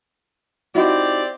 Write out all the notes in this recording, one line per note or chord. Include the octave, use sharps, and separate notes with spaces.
C4 D#4 E4 F#4 G4 D5